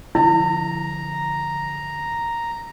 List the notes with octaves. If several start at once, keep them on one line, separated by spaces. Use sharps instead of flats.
D3 F3 E4 A#5